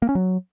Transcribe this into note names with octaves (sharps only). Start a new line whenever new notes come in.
A#3
C#4
F#3